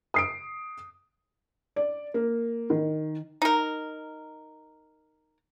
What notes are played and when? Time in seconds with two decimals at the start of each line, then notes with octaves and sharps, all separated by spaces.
0.14 D#6 C7 D7
1.76 D5
2.14 A#3
2.70 D#3
3.42 D#4 A#4